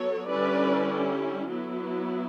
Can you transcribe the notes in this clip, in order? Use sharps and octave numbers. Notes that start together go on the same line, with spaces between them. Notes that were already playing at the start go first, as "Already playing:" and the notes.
Already playing: F#3 B3 A4 C#5
D3 G3 C#4 E4 B4 D5
F#3 B3 E4